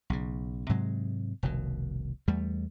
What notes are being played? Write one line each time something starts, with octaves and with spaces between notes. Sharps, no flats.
B1 C#3
G#2 C3 F#3 G#3
F1 C2 B2 D#3
E2 G3 A3